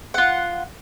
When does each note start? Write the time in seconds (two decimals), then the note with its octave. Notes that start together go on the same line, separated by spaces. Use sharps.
0.14 F4 F#5